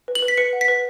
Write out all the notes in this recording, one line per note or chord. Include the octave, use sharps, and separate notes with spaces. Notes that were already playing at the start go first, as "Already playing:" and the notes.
B4
F#7
B4
B6
B4 C#7
F#5
B6
B4